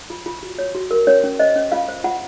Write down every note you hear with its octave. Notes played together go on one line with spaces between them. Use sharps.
F4
F4
F#4
C#5
F#4
A#4
C#4 C#5
C#4
C5 D#5
C#4
F4 F5
C5
F4 F#5